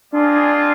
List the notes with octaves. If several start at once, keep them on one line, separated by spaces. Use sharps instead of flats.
G#3 C4 D4 F4 G#4 D5